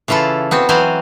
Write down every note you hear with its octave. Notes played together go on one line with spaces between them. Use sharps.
C#3 E3 E4 F4 A4
B3 C4 F#4
E3 F#3 C4 C5 F5 G#5